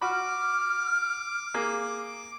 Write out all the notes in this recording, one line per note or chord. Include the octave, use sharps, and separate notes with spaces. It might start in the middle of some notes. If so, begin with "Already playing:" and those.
F#4 B5 D6 F6
A#3 G#4